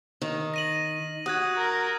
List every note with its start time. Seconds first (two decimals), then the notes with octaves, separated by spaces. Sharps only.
0.22 D#3
0.54 A#6 D#7 F#7
1.26 F#4 D#6 F#6 G#6
1.57 A#4